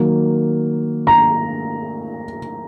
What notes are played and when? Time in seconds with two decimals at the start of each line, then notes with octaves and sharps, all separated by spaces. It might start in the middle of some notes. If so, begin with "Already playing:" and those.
Already playing: D#3 F#3 A#3
1.07 A#5